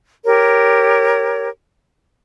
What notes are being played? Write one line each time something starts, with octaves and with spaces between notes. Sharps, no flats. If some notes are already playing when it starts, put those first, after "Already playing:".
G4 A#4 C#5